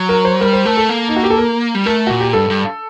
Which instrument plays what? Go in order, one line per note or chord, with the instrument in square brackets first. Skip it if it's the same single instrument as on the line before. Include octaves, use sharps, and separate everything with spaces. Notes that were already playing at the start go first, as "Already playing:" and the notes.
Already playing: [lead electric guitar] F#3
[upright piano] A#4
C5
[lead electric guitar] G3 [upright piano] A#4
[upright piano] C5
[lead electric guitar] A3 [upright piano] A#4
[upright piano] A4
[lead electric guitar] A#3
[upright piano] D#4
F#4
G4
A4
A#4
[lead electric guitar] G3
[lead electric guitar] A3 [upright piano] A#4
[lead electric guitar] A#2 [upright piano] F#4
[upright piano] G4
[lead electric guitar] G2 [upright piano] A4
[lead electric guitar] G2